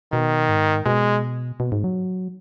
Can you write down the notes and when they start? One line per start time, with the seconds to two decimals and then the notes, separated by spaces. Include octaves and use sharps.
0.12 B2 D#3
0.49 G#2
0.86 B2 G#3
1.60 B2
1.72 G#2
1.84 F#3